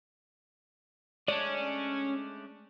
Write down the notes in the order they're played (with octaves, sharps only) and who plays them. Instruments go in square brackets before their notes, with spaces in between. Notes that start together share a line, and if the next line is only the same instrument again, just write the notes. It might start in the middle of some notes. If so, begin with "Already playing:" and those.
[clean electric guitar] G#3 A3 D4 [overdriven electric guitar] C#4 [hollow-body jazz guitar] D5